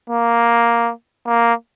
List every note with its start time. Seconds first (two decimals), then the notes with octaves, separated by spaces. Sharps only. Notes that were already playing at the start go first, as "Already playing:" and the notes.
0.10 A#3
1.26 A#3